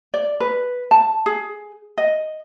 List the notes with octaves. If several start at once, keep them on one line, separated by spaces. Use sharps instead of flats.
D5
B4
A5
G#4
D#5